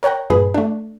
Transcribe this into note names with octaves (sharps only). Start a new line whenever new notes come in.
A#4 C#5 F#5 G5 A#5
G2 A#2 G#4 B4
A3 D4